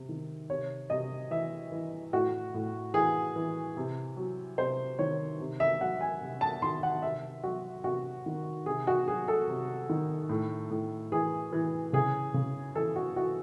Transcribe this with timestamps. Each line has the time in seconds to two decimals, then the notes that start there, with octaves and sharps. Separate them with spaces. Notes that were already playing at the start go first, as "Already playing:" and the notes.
Already playing: C3
0.09 D#3
0.50 C3 C#5
0.90 C3 D#5
1.31 E3 E5
1.72 E3
2.13 A2 F#4
2.54 A2
2.94 E3 G#4
3.36 E3
3.77 C3
4.17 F#3
4.58 C3 C5
4.99 D#3 C#5
5.40 C3
5.60 E5
5.81 F#3 F#5
6.01 G#5
6.21 C3
6.41 A5
6.62 D#3 C6
6.83 F#5
7.02 C3 E5
7.43 F#3 F#4
7.84 C3 F#4
8.26 D#3
8.66 C3 G#4
8.87 F#4
9.07 F#3 G#4
9.28 A4
9.47 C3
9.90 D#3
10.29 A2
10.70 A2
11.12 E3 G#4
11.53 E3
11.93 C#3 G#4
12.34 C#3
12.75 E3 A4
12.96 F#4
13.16 E3 F#4